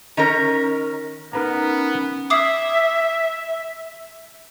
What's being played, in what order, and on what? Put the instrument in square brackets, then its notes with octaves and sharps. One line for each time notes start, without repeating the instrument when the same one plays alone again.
[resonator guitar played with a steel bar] D#3 C#4 A#4
[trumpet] B3 [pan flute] C#4 [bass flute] D#4 [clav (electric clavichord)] A#4 B4 A#5
[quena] E5 [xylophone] D6 D#6 C7